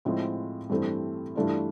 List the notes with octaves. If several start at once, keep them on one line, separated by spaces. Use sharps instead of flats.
A2 F3 G#3 C4
G2 E3 A3 C4
G2 E3 A3 D4 F4